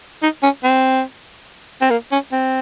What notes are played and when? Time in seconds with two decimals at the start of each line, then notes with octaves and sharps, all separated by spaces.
0.22 D#4
0.43 C#4
0.64 C4
1.82 C4
1.90 A#3
2.12 C#4
2.32 C4